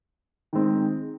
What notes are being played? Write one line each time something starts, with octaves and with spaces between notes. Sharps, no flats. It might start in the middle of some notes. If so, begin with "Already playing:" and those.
D#3 G#3 C4 D#4